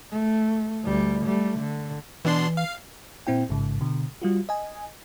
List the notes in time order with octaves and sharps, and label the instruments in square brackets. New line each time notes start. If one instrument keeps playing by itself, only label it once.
[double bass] A3
D2 G3
G3 A3
D3
[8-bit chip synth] B2 D4 C6 [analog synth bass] E3
[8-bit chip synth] F5
[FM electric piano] A#2 C4 E4 G5
A1 G#2 C#3
B2 D3
G3 F4 F#4
D#5 G#5